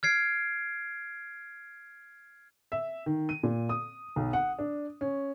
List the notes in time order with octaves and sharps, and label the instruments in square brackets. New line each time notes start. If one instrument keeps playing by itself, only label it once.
[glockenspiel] F6 G#6 C7 D7
[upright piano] E5
D#3
D#7
A#2
D#6
B1
F#5
D4
C#4